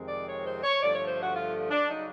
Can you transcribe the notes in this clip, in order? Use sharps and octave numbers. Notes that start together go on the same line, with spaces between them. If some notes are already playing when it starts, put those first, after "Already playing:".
Already playing: F2 C3 D#3 G#3 C4
D5
C#5
C5
C#5
G2 D3 F3 A3 D5
C#5
C5
F#4
F4
D4
C#3 F#3 D#4